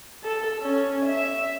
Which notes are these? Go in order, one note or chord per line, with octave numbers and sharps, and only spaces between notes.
A4
C#4
E5